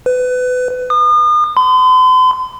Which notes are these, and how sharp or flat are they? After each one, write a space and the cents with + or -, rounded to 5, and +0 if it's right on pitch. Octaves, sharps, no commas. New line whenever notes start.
B4 +25
D#6 -40
C6 -45